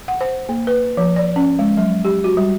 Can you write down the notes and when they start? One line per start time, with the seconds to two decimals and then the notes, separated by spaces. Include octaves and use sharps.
0.08 F#5
0.21 C5
0.49 A#3
0.67 B4
0.97 F3
1.16 D5
1.36 C#4
1.59 G#3
1.77 F#3
2.05 G4
2.24 F#4
2.37 G3